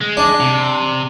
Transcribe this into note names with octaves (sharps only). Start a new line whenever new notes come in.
G#3
D4
C3